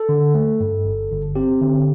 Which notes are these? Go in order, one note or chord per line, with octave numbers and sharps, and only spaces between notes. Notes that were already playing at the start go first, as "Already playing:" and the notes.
Already playing: A4
D3
A3
G2
G1
G1
C4 G4
D3